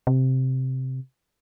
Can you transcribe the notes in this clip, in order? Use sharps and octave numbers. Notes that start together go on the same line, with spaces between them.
C3